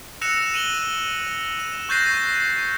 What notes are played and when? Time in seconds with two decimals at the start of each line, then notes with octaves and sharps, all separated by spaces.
0.21 E6 F#6 A#6 C#7 E7 F7
0.54 D#7 F#7 G7
1.60 E7
1.89 C#6 F#6 G6 A6 A#6 C7